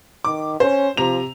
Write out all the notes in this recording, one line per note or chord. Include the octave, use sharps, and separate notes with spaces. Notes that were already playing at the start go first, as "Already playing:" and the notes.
D#3 D6
C#4 C5
C3 F3 A#5 F7